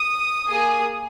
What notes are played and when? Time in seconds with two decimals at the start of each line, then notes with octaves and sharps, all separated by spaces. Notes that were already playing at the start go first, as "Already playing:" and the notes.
Already playing: D#6
0.48 A#3 G#4